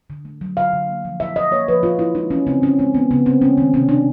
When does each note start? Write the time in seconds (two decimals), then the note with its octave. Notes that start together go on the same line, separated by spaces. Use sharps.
0.10 D3
0.25 A3
0.41 F#3
0.57 D3 F5
0.73 D3
0.88 A#3
1.05 F3
1.20 A#2 E5
1.36 A#2 D#5
1.52 A#3 C#5
1.68 F3 B4
1.83 A#2 F4
1.99 A#2 E4
2.15 G#3 D#4
2.30 E3 C#4
2.47 C#3 C4
2.62 C#3 C#4
2.79 G#3 C4
2.94 E3 B3
3.11 C#3 B3
3.26 C#3 C4
3.42 G#3 C#4
3.58 D#3 C4
3.74 C3 C#4
3.89 C3 D4